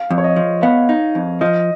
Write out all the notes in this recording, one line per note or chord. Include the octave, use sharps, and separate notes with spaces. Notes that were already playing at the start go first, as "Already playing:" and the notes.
Already playing: F5
F2
C#5
D#5
F3
B3 F5
D#4
F2
F3 D#5